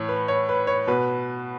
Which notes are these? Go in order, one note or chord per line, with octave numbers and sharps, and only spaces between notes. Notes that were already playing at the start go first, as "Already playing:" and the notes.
Already playing: A2 E3 C#5
B4
C#5
B4
C#5
B2 B4